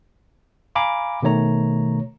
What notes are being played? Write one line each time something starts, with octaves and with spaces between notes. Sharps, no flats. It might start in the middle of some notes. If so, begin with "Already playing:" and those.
F5 G#5 A#5 B5 D6
B2 D#3 A3 C#5 A#5